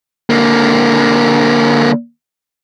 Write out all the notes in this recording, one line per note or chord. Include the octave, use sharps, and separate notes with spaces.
D3 A#3